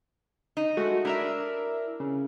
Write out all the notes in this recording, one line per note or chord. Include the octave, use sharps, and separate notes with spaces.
D#4
G#3 A3 F#4
D4 E4 A#4 E5
C#3